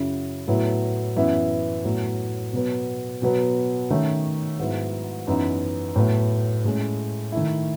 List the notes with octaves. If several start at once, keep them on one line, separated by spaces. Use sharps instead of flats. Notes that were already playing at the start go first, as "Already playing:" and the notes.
Already playing: F#2 C#3 F#3 C#4 E4
A2 F#3 B3 E4
F#2 E3 B3 E4
A2 F#3 B3
B2 F#3 B3
B2 F#3 B3
D#3 A3 C#4
G#2 F#3 B3 E4
F#2 E3 B3 D#4
A2 F#3 B3
A2 G#3 C#4
D#3 A3 E4